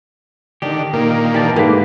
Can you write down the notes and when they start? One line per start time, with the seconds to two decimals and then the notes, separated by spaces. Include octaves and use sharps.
0.62 D3 D#3 D4 G4
0.93 A#2 D#3 A#3
1.34 E3 G4 D5 A5
1.56 G#2 D3 A#3 G4 B4